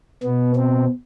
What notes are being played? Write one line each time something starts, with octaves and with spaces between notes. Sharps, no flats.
B2 B3
C4